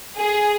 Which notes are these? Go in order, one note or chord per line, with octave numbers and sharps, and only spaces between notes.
G#4